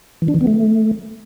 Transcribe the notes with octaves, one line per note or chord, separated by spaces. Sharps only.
E3
D4
E3
B3
A3